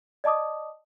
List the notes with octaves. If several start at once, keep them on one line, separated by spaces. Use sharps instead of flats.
D5 D#5 A5 D6 D#6